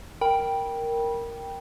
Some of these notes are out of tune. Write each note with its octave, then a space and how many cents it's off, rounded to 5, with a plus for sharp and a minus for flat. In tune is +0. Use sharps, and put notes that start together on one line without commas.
A#4 +0 G5 +0 B5 -20